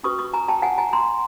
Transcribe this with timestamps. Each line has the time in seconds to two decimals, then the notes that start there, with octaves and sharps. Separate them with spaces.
0.03 C#4 F#4 B4 C#6 D#6
0.19 C#6 D#6
0.33 G#5 A#5
0.48 G5 A5
0.62 F#5 G#5
0.78 G#5 A#5
0.93 A#5 C6